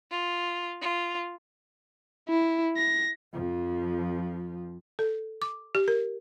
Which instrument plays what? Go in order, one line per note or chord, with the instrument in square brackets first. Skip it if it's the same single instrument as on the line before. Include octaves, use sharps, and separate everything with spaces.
[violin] F4
F4
[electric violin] E4
A#6
[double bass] F2 F3
[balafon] A4
D6
G4
A#4